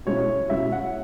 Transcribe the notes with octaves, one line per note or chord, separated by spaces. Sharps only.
B2 G#3 C#4 E4 C#5
B2 G#3 C#4 E4 E5
F#5